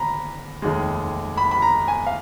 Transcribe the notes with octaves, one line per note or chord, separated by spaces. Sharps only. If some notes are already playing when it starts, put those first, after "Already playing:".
Already playing: D#2 D3 A#5 B5
F1 D#2 D#3 G#3
B5
B5
A#5
G#5
F5